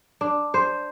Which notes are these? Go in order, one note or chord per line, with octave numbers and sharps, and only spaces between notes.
D4
C5